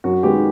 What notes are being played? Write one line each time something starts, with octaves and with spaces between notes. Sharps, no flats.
F#2 F#4
D#3 G#3 B3 G4